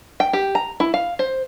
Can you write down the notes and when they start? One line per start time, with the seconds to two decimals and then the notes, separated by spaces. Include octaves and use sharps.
0.20 G5
0.33 G4
0.55 A#5
0.80 E4
0.94 F5
1.19 C5